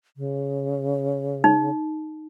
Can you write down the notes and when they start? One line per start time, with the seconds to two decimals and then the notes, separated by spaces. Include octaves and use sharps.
0.17 C#3
1.44 D#4